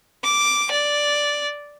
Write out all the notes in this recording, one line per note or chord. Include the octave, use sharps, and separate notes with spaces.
D6
D5